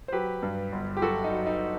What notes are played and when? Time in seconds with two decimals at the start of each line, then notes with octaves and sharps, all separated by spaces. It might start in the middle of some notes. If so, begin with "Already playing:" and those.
0.08 C5
0.12 F#3 G4 B4
0.43 G2
0.72 G1
0.97 G4
1.02 F#3 F#4 A4
1.24 D#4
1.32 F#3
1.46 D#4